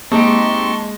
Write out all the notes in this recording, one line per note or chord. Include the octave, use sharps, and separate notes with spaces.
G#3 A#3 C4 D#4 G4 A5 C6 C#6